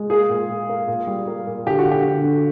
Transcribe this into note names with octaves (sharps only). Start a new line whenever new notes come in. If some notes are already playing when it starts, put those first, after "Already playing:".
Already playing: G#3
A#3 G#4
A#2
A#2
A#3
A#2
G3
A#3
A#2
D3 G4
F#4
D3
G4
D3
D3